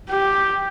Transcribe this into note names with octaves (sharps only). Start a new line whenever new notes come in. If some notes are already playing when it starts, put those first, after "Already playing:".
G4